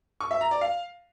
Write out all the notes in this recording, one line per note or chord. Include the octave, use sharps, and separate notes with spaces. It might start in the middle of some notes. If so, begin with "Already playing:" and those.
C#6
E5
A#5
D5
F5